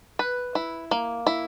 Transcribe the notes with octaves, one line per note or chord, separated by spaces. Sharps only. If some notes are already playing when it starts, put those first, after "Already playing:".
B4
E4
A#3
E4